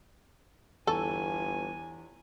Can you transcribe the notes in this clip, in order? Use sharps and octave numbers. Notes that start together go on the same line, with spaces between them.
G1 E2 E3 A4 G#5 C#6